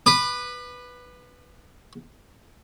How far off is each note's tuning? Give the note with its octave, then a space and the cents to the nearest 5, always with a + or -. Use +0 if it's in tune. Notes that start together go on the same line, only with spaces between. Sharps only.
B4 +0 D6 +40